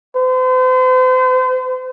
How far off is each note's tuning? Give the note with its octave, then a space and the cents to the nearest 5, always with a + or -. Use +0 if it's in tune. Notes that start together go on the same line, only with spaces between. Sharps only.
C5 -40